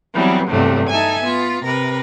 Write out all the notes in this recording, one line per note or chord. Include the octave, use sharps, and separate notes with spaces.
E3 F#3 G3 B3 C4
E2 G2 C3 F#3 A3
D#4 A4 E5 G#5
B3 F4
C3 A#4 B4